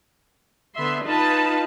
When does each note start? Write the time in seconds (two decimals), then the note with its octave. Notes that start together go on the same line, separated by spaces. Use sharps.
0.75 D3 B3 E5 C6
1.06 D#4 F4 B4 A5 B5